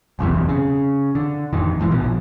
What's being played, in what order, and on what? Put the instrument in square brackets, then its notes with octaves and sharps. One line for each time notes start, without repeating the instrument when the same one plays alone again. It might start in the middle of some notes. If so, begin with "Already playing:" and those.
[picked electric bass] F#1 B1 E2 C3
C#3
D3
A1 F2 D#3
G1 G#2 E3
A#1 B2 F3